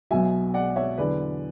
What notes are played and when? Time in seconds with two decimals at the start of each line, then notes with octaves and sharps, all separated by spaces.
0.11 B1 B2 F#3 E5 G#5
0.54 D5 F#5
0.76 C#5 E5
0.98 E2 D3 F#3 B4 D5